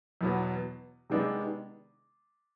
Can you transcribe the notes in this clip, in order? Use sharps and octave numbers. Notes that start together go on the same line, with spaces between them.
E2 B2 F#3 B3
C3 D#3 G#3 B3 D4